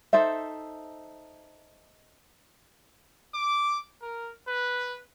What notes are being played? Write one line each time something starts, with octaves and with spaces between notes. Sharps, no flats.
D#4 A4 C5 E5
D6
A#4
B4